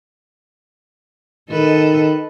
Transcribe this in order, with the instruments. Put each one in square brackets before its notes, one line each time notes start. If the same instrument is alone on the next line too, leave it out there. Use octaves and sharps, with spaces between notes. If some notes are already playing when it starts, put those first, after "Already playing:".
[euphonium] D#3 [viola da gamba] A4 B4 D#5